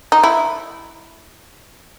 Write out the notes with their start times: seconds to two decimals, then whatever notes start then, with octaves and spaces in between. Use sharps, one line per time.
0.12 D#4
0.23 E4